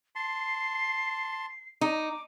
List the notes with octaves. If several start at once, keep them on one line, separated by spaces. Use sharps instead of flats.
A5 C6 C7
D#4 D6